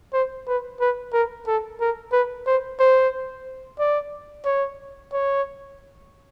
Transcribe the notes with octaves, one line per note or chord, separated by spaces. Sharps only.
C5
B4
B4
A#4
A4
A#4
B4
C5
C5
D5
C#5
C#5